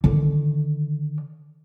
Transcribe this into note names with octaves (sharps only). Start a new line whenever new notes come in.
D3 D#3